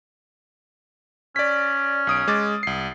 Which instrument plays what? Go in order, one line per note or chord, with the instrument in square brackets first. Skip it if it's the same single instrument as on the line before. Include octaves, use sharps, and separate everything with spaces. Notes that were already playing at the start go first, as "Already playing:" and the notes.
[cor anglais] C#4 [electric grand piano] D5 B6
[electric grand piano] B1 D#6 D7
G#3 D6 A6
C2 C7